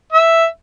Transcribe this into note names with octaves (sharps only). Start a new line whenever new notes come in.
E5